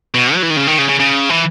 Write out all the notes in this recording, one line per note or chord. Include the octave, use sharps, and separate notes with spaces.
B2
F#3
E3
D#3
C#3
D#3
C#3
C#3
C#3
E3